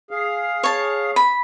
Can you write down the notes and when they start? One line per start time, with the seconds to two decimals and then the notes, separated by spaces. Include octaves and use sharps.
0.11 G#4 F5
0.63 C#5 A5
1.16 B5